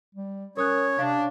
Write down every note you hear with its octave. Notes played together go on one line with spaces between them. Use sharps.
G3
C#4 A#4 C#5 D#6 F#6
C3 D4 F5